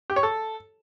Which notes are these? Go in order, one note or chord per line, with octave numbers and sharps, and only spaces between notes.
G4
C#5
A4